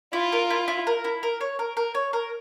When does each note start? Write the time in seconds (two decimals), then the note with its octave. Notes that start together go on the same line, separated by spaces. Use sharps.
0.13 E4 F4
0.32 A#4
0.50 E4
0.68 E4
0.87 A#4
1.04 E4
1.23 A#4
1.41 C#5
1.59 A#4
1.77 A#4
1.95 C#5
2.13 A#4